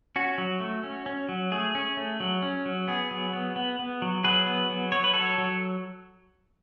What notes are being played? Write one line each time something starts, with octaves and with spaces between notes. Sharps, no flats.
C#4 F#4
F#3
A3
C#4
C#4
F#3
A3 G#4
C#4
A3
F#3
C#4
F#3
B3 G#4
F#3
B3
B3
B3
F#3
F#3 G#4 B4
B3
F#3
F#3 C#5
B4
F#3 A4 C#5
F#3